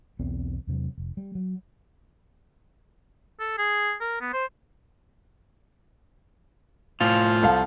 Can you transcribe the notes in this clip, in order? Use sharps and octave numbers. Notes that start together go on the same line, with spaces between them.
B1 E2 B3 C4
E2 C3 F#3
F1
G3
F#3
A4
G#4
A#4
B3
C5
A2 F3 F4
C2 A4 F5